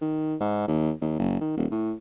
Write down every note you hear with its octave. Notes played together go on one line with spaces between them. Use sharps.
D#3
G#2
D#2
D#2
F#1
D#3
D#1
A2